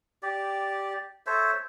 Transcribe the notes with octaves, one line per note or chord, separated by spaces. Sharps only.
G4 D5
A4 C5 C#5 E5